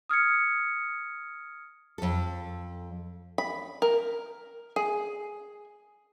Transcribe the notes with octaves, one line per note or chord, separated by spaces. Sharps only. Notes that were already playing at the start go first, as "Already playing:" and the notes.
D#6 F6 G#6 C#7
F2 A4
B5
A#4
G#4